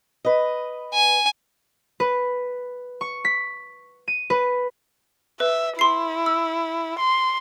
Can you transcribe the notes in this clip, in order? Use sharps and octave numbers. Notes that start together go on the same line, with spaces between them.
B4 D#5
G#5
B4
C#6
B6
D#7
B4
B4 E5
E4 C6 C7
E6
C6